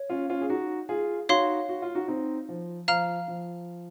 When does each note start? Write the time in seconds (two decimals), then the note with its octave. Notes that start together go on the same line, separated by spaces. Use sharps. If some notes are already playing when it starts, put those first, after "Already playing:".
Already playing: C#5
0.09 C#4 F4
0.29 C#4 F4
0.41 G#4
0.50 D#4 F#4
0.89 F4 G#4
1.29 D#4 F#4 C#5 F5 C6
1.69 F#4
1.82 F4
1.95 D#4 F#4
2.08 C4 D#4
2.49 F3
2.88 F3 F5 A#5 F6
3.28 F3